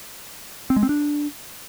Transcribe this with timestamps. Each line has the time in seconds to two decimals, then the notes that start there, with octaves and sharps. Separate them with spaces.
0.70 C4
0.76 G#3
0.83 C4
0.89 D4